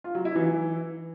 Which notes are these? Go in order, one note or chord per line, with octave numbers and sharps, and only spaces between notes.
F4
F#3
E4
E3